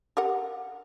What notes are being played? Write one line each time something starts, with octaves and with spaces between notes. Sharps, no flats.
G4 A#4 F#5